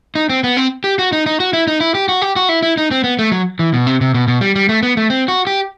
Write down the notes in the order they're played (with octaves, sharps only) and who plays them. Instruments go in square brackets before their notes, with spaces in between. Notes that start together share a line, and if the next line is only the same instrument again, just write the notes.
[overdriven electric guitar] D#4
C4
B3
C4
G4
F#4
D#4
D#4
F#4
E4
D#4
E4
G4
F#4
G4
F#4
E4
E4
D#4
C4
B3
A3
F#3
E3
B2
C3
C3
B2
B2
G3
G3
A3
B3
A3
C4
F#4
G4